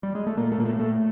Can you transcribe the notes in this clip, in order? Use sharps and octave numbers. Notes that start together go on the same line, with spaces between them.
G3
G#3
A3
A#2 A#3
A3
A#2 A#3
A3
A#2 A3